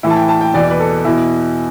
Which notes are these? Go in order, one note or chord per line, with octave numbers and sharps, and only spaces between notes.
A2 E3 E4
A5
G5
A5
G5
E2 B2 D5
B4
A4
E2 B2 E4